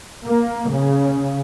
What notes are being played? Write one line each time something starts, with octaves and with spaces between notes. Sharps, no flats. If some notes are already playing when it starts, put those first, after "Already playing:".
A#3
C#3